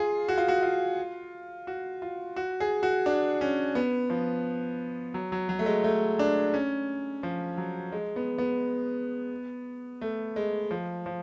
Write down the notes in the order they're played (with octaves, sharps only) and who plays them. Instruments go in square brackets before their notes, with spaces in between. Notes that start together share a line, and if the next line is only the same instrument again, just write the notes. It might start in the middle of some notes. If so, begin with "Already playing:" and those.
Already playing: [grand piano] F4 G#4
F#4
F4
F#4
F4
F#4
F4
F#4
G#4
F#4
D4
C#4
B3
F3
F#3
F#3
F#3
A3
G#3
A3
D4
C#4
F3
F#3
G#3
B3
B3
A3
G#3
F3
F3